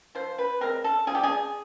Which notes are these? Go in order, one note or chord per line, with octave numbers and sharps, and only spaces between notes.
F3 C5
B4
G#3 C4 A#4
A4
F3 G#4
G4
G#4